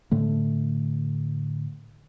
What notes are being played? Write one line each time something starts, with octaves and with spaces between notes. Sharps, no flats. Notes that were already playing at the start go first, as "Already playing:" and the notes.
A2 D3 A3